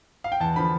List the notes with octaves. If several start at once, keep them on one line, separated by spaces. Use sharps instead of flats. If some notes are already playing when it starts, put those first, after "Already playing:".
F5
G5
E2 A5
D3 F3 B5